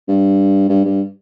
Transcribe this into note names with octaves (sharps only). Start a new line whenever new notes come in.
G2
G2
G2